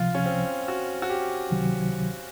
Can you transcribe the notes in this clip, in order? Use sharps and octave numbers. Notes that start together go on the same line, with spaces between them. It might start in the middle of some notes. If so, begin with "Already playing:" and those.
Already playing: C#2 C3 F3 F4
C#4
C4
F#4
F#4
G4
C#2 C3 D#3 F#3